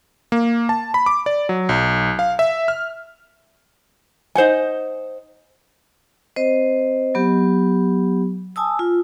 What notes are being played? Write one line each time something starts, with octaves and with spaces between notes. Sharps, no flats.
A#3
A5
B5
D6
D5
F#3
B1
F5
E5
F6
D#4 C5 F#5 G#5
C4 C5 D#5
F#3 B3 G4
G#5 A5 D#6 E6
F4